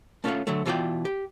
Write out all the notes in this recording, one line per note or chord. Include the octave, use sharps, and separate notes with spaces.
A3 C#4 F4 A4 F5 F#5
D3 F#3 A3
B2 E3 F4 A4 D5 G5
G4